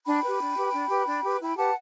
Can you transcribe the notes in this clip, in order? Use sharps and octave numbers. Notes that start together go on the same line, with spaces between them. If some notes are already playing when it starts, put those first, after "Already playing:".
D4 G5 B5
B4
G4
D4
G4 B4
D4
G4 B4
D4
G4 B4
E4 G5 B5
G4 B4 F#5 A5